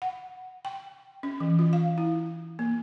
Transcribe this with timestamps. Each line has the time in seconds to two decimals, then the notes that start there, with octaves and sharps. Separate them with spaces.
0.02 F#5
0.65 G5
1.23 C#4
1.40 E3
1.59 F4
1.73 F5
1.98 E4
2.59 A#3